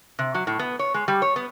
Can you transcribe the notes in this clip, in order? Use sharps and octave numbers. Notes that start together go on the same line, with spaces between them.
C3
F#3
A2
B3
C#5
G#3
G3
C#5
B3